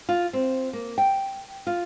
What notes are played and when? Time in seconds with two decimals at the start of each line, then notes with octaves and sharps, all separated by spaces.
0.09 F4
0.33 C4
0.73 A#3
0.98 G5
1.67 F4